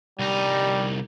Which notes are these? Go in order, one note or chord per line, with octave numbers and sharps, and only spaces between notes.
C2 G3 D#4